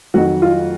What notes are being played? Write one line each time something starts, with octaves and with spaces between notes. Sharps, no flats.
F2 D#3 F#3 F#4
F4